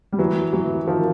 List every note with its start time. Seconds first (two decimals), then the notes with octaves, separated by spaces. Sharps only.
0.12 G3
0.19 E3 F#3
0.53 E3 F#3
0.87 D#3 F3